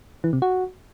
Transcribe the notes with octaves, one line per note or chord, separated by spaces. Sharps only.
E3
C3
F#4